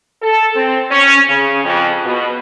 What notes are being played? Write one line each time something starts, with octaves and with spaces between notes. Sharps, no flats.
A4
C4
C#4
C#3
F2
B2